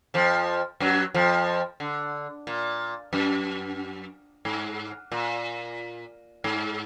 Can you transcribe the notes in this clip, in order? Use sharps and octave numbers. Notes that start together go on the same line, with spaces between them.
F2 F3
F#2 F#3
F2 F3
D3
A#2
F#2
G#2
A#2
G#2